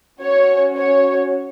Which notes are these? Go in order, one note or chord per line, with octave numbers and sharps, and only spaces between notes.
C#4 F#4 C#5
C#5